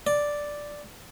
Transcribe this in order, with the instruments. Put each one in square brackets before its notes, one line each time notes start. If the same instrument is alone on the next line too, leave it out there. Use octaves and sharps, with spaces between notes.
[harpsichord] D5